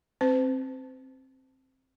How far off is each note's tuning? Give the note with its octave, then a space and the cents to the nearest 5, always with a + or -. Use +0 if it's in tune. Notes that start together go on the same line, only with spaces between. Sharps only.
C4 +15 C5 -45